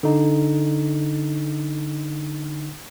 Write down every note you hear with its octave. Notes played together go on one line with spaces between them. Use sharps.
D3 D#4